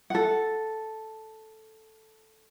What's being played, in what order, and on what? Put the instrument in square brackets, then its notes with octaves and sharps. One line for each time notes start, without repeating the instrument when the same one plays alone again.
[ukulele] A4 F#5